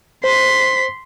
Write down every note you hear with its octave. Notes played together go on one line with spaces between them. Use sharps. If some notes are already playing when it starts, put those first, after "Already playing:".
C5 C6 B6